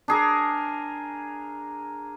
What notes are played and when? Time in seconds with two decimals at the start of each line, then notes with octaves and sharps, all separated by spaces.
0.08 D4 G#4 A#4